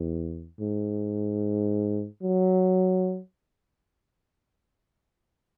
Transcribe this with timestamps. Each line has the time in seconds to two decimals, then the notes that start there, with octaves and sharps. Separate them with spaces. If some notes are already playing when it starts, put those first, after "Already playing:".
Already playing: E2
0.60 G#2
2.23 F#3